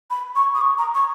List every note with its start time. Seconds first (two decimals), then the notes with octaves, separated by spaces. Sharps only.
0.10 B5
0.35 C#6
0.55 D#6
0.61 C#6
0.78 A#5
0.94 C#6